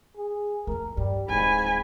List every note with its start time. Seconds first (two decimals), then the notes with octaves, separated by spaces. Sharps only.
0.17 G#4
0.67 F2 A3 A#4
0.97 G2 G3
1.30 D1 G#2 C4 G#5 B5